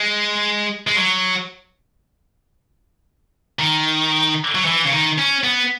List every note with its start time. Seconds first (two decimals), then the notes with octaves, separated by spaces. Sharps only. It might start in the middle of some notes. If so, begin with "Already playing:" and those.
Already playing: G#3
0.87 G#3
0.96 F#3
3.59 D#3
4.55 F#3
4.65 E3
4.85 C#3
4.91 D#3
5.18 C#4
5.44 B3